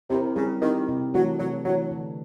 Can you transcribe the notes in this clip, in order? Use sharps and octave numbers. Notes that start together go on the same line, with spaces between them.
C3 C4 E4 G4 A#4
C#3 G3
D#3 C4 E4 G4 A#4
C3
E3 F#3 A3 D4
C3 F#3
E3 F#3 A3 D4
D3